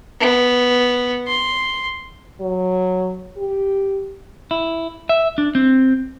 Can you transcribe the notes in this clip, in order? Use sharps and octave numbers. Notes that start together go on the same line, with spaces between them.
B3
C6
F#3
G4
E4
E5
D4
C4